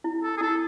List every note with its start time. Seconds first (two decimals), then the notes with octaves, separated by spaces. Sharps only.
0.04 E4
0.23 A4
0.37 G#4
0.41 E4 A4